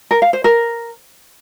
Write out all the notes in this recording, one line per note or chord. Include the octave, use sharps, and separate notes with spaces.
A#4
F5
C5
A#4